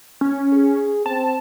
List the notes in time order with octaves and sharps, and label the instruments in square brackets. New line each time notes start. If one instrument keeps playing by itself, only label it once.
[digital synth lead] C#4
[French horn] G#4
[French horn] C4 [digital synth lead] A5